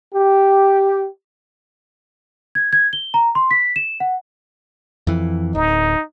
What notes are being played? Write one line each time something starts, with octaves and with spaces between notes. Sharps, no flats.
G4
G#6
G#6
G7
A#5
C6
B6
E7
F#5
F2 E3
D1 D#4